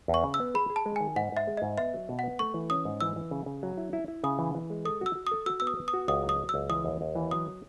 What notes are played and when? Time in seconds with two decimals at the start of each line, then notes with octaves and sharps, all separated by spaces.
0.08 E2
0.14 C#6
0.24 C#3
0.34 E6
0.40 B3
0.54 G#4 B5
0.70 G#4
0.76 A5
0.86 G#3
0.96 D#3 G#5
1.16 G#2 F#5
1.32 G#2 E5
1.47 G#3
1.57 G#2 D#5
1.78 B3 E5
1.94 F#3
2.09 B2
2.19 B3 F#5
2.39 A3 C#6
2.54 E3
2.70 C#4 D#6
2.85 G#2
3.00 E3 E6
3.16 E3
3.31 C#3
3.46 C#3
3.63 F#3
3.77 E4
3.93 E4
4.08 E4
4.24 C#3 D#6
4.39 E3
4.55 E3
4.70 G#3
4.85 A4 D#6
5.01 F#4 E6
5.15 F#4
5.27 A4 D#6
5.46 F#4 E6
5.60 B3 E6
5.67 D#6
5.77 B3
5.88 D#6
5.93 F#4
6.08 C#2 D#6
6.23 F#3
6.29 D#6
6.40 F#3
6.49 C#2 E6
6.69 E3 D#6
6.85 D#2
7.01 D#2
7.15 E3
7.31 F#3 D#6